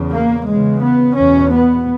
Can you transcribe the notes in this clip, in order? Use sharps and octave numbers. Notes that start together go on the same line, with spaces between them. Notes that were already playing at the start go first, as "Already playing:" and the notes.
Already playing: E2 C#3
A#3
E2 C#3 G#3
B3
E2 B2 C#4
B3